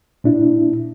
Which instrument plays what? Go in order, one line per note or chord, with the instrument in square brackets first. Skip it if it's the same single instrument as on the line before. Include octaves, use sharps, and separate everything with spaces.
[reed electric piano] A#2 D4 E4